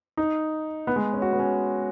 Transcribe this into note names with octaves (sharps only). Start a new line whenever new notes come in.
D#4
B3
G#3
C#4
F#4
B3
C#4